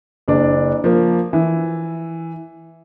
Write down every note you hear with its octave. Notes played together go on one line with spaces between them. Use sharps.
F#1 D4 D5
F3 A#3
E3